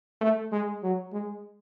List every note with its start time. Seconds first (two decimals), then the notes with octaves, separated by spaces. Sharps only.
0.21 A3
0.52 G#3
0.83 F#3
1.13 G#3